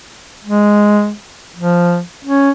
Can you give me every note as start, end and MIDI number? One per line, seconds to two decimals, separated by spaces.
0.44 1.12 56
1.56 2.01 53
2.25 2.51 61